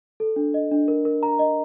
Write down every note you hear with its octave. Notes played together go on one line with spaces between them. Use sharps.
A4
D4
D#5
D4
A#4
A#4
A#5
D#5